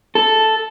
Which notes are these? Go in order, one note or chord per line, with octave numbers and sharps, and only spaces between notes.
A4